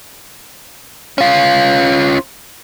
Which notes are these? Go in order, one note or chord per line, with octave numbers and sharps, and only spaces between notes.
C#4 F4